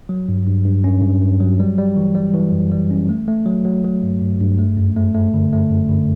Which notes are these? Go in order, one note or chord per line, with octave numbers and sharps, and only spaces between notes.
F#3
G2
G2
G2
C#4
G2
G2
F#3
G3
G3
E3
G3
E3
F#2
G3
C#4
A3
A3
F#3
F#3
F#3
G2
G2
G2
A3
F#2
A3
A3
D3
A3
F#2
D3